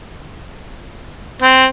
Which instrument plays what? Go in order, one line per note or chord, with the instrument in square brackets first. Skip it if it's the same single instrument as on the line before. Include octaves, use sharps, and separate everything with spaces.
[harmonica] C4